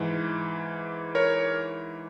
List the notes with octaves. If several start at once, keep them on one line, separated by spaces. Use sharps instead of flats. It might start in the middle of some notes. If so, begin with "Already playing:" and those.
Already playing: G#2 E3
A#4 C#5